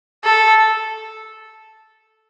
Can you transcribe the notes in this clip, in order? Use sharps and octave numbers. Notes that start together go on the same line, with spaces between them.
A4